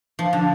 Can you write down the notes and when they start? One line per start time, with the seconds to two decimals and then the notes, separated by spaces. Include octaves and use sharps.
0.19 F3
0.33 D3